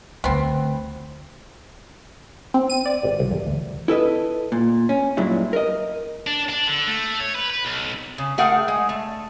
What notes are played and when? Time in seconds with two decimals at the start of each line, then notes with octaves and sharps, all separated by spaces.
0.24 D2 D3 B3 C4
2.54 C4
2.70 D#7
2.86 D5
3.03 G#1
3.20 C2
3.31 E2
3.46 D2
3.88 E4 A4 B4 D#5
4.52 A#2
4.89 C#4
5.17 G2 A#2 F#3 G#3 E4
5.53 A#4 D#5
6.27 D4
6.49 D4
6.67 D3
6.87 A3
7.20 C#5
7.35 B4
7.50 B4
7.65 B1
8.18 C#3
8.38 A3 G#4 A#4 F#5 G5
8.68 G#3
8.89 A3